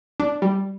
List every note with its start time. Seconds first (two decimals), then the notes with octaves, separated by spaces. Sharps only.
0.20 D4
0.42 G3